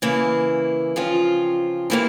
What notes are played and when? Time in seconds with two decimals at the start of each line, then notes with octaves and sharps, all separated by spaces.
0.02 C#3 E3 A#3 E4
0.96 C#3 F3 C4 F4
1.90 C3 E3 A#3 E4